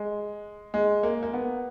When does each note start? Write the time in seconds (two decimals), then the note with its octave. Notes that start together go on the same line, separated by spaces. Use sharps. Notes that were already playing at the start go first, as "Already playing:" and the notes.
Already playing: G#3
0.74 G#3
1.03 A#3
1.23 A#3
1.34 B3